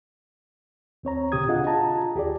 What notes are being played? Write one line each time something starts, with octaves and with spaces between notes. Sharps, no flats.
D#2 C4 C#5 A#5
D2 A#2 C#3 G4 D#6 G#6
D4 F4 G#4 D#5 F#5
F4 A5 A#5
D#2 G4 G#4 D5